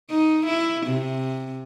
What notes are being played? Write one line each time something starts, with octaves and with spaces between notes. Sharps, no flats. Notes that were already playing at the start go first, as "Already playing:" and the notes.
D#4
E4
C3